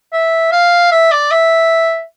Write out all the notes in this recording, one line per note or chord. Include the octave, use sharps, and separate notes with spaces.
E5
F5
E5
D5
E5